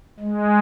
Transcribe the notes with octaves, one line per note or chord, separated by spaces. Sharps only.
G#3